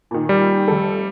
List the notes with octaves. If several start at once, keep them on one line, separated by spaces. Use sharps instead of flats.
A#2 D#3
G3
F1 A4